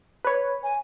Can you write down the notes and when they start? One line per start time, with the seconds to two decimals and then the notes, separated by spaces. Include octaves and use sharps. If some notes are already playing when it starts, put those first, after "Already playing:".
0.25 B4 C#5
0.63 G#5